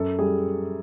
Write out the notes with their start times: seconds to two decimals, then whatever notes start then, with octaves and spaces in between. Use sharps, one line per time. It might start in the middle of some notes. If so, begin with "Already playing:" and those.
Already playing: F#2 A4
0.19 G3 G#4